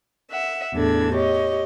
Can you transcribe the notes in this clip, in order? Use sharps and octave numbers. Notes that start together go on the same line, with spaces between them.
E5 F#5
E2 A2 E3 D4 A4 G#6
G4 C#5 D#5